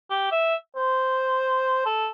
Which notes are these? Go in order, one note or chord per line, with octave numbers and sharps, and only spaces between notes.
G4
E5
C5
A4